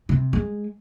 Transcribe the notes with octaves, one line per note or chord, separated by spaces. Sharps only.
C3
G#3